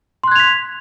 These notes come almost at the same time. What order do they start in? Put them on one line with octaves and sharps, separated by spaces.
C6 F#6 G#6 F7 B6